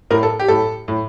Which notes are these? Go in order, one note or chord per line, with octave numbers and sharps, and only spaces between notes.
A2 A#4
A4
G4
A2 A4
A2